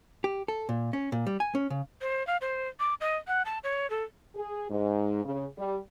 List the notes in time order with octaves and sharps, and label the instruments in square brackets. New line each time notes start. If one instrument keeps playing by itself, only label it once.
[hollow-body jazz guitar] G4
A4
A#2
C#4
A#2
G3
G#5
C#4
C#3
[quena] C5
F5
C5
D6
D#5
F#5
A5
C#5
A4
[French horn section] G#4
G#2
C#3
G3